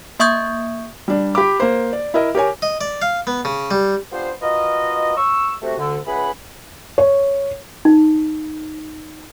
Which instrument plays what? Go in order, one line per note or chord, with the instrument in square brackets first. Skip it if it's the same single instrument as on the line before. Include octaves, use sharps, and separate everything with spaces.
[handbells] A#3 E5 C#6 D#6 G6 G#6
[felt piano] G3 D4
G4 B5 D6
A#3 C5
D5
E4 A#4 D#5
G4 A#4 C#5 G#5
[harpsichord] D#5
D5
F5
B3
C#3
G3
[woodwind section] B3 D4 F4 G4 C5
F4 F#4 A#4 B4 D#5
C#6 E6
C3 A3 F#4
D2 D3
C#2 G#4 B4 E5 F#5 B5
[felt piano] C#5
[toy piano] D#4